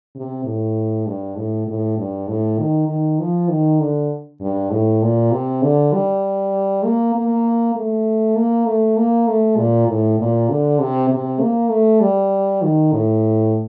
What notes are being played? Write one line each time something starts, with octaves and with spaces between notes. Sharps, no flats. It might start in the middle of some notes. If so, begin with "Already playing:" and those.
C3
A2
G2
A2
A2
G2
A2
D#3
D#3
F3
D#3
D3
G2
A2
A#2
C3
D3
G3
A#3
A#3
A3
A#3
A3
A#3
A3
A#2
A2
A#2
D3
C3
C3
A#3
A3
G3
D#3
A2